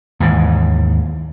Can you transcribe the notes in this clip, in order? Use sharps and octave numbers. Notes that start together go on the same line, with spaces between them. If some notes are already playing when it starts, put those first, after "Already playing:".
D#2 G#2 E3